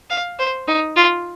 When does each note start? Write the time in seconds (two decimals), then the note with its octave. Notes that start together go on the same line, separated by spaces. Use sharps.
0.10 F5
0.39 C5
0.68 D#4
0.96 F4